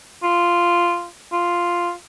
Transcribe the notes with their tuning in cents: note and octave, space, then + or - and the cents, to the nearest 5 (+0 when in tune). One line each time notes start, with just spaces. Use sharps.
F4 -5
F4 +0